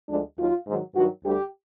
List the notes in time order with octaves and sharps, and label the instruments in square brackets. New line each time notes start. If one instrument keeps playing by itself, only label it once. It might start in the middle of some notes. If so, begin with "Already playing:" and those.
[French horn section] D2 D3 F3 G#3 D4
D#2 D#3 F#3 F4
G#2 D#3 F#3
G2 D#3 F#3 F#4
D2 D3 G3 G4